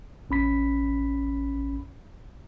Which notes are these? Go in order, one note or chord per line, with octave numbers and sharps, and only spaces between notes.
A1 C#4 B5 B6